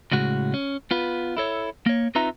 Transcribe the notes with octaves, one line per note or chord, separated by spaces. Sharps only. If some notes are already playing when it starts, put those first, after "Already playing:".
A2 C#3 G#3 F#4
C#4
B3 F4 B4
E4 A4 C#5
A#3 C#5
C4 D#4 F4 B4 E5 A#5